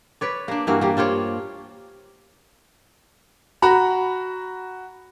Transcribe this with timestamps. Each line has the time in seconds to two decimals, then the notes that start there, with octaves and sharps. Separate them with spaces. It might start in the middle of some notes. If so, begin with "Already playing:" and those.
0.21 B4 C#5 D5
0.48 A#3 D4
0.67 G2 E3 A#3 F#4
0.81 G3 A#3
0.97 D4 F4 C5 C#5
3.62 F#4 A#5 B5